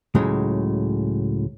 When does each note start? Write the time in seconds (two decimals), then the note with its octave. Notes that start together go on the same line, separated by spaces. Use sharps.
0.15 C#2 A2 C#3 F#3 G#3